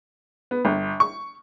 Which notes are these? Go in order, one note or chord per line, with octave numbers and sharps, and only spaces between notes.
B3
G1
C#6